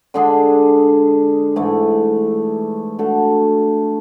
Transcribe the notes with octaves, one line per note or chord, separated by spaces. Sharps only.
D3 G#3 D4 G#4
G#2 E3 A3
A3 D4 F#4 A4